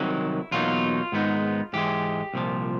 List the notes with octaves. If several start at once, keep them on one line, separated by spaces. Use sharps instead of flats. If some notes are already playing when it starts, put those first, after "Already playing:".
Already playing: C2 C3 D#3 F#3 E4
E2 B2 F#3 A#3 D#4 F4
G#2 D#3 G#3 B3 D#4
G#2 E3 G#3 G4
C2 A#2 F3